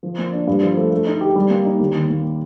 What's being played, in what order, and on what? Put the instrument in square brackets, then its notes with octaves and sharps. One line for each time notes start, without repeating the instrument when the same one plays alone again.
[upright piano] F3
A#3
D4
G2
F3
A3
A3
D#4
G4
G3
A#3
D#4
D#2
D#3
A#3